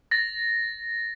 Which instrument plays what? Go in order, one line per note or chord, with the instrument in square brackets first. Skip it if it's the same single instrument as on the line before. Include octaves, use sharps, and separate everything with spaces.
[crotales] A6 A#6